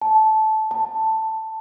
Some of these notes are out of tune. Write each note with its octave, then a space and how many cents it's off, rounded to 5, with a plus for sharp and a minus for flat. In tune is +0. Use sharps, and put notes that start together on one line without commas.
A5 -15
A5 +10